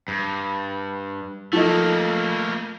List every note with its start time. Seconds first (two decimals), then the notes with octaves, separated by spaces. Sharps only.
0.08 G2
1.53 F3 A3 A#3 A4 D#5